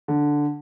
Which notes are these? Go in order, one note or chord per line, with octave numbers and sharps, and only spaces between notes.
D3